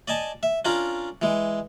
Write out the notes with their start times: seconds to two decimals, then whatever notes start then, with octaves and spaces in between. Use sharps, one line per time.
0.08 D5 D#5 G#5 A5
0.43 E5
0.65 C#4 D4 F4 A#4 D5
1.22 E3 G#3